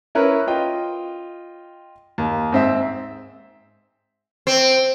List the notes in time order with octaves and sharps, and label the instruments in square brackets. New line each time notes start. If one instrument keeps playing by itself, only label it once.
[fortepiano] C#4 E4 A#4 B4 C#5
F4 D#5 G5
D#2
G#2 C4 E5
[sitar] C4